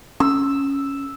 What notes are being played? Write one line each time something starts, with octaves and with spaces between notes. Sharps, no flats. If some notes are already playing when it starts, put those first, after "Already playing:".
C#4 E6